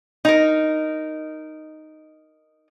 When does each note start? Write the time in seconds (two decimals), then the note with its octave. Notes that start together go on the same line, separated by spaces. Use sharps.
0.25 D#4 A#4